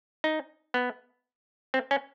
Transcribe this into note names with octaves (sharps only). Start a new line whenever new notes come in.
D#4
B3
C4
C#4